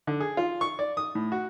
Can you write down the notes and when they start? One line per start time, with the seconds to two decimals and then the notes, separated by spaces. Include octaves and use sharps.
0.07 D3
0.20 G#4
0.37 F4
0.61 C#6
0.79 D5
0.97 D#6
1.15 A2
1.32 F#4